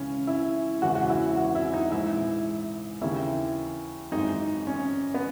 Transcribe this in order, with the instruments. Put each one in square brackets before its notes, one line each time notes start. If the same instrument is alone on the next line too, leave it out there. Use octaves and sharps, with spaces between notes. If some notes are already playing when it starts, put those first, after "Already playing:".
Already playing: [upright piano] C#2 C#3 E3 C#4
E4
E1 E2 C#3 E3 F#4
F#4
E4
F#4
E4
D#4
A#1 G#2 E3 E4
D#2 C#3 E3 E4
G#1 F#2 E3 D#4
C#4
B3